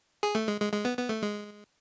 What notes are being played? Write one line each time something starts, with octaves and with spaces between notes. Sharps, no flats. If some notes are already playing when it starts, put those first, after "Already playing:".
G#4
A3
G#3
G#3
G#3
B3
B3
A3
G#3